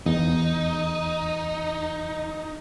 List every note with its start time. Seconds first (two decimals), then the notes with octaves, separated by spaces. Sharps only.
0.06 E2 D#4